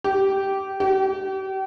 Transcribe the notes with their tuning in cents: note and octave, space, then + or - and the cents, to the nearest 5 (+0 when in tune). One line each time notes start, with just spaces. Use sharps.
G4 -15
G4 -40